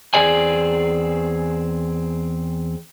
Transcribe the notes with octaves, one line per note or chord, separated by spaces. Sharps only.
E2 C4 G#4 D5 G#5